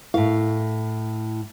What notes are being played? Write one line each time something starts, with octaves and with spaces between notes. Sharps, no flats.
A2 E4 F5